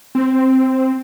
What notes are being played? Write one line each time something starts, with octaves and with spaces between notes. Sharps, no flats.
C4